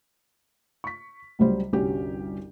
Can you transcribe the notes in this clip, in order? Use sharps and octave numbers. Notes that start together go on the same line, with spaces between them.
C#6 B6
C#2 F#3 G3 C5
G1 C2 C#4 F#4 G4